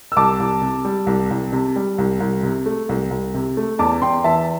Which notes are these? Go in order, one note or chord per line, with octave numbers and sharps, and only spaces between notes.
E6
C2 A5 D6
C2
C3
G3
C2
C2
C3
G3
C2
C2
C3
A3
C2
C2
C3
A3
E2 A5 D6
E2 G5 C6
E3 E5 A5